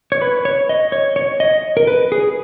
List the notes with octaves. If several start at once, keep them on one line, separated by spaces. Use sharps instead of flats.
C#5
B4
C#5
D#5
C#5
C#5
D#5
A#4
B4
G#4